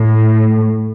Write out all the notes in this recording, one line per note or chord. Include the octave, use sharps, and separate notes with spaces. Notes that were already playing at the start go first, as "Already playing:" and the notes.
Already playing: A2